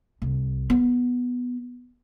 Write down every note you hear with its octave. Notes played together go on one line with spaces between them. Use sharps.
C2
B3